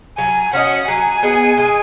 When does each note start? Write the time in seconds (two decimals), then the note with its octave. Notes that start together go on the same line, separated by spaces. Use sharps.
0.18 F#3 G#5
0.53 C#4 F#4 D#5 F#5
0.88 F#3 G#5
1.22 B3 G#4 D#5
1.58 G#3